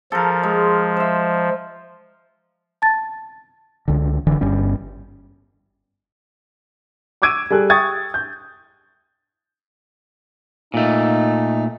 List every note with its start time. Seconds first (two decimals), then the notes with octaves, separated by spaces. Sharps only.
0.12 F3 A4 A#4
0.43 G#3
0.96 C5 E5
2.82 A5 A6
3.88 C#2 D3
4.27 F#1 D3 E3
4.41 G1 G2 G3 C#4
7.22 C#6 D6 E6 G#6 D7 D#7
7.50 G3 G#4 A4 F#6
7.70 G5 C#6 D#6 G#6 A6
8.14 G6
10.74 A#2 A3 D#4